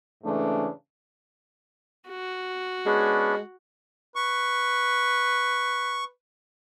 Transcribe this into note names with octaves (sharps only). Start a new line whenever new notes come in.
G#2 C#3 E3 A3 C#4 D4
F#4
G#3 B3 C#4 D4
B4 C#6